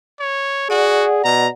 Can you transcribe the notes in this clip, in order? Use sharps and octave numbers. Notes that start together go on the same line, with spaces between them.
C#5
F#4 G#4 D5 F#5
B2 A#5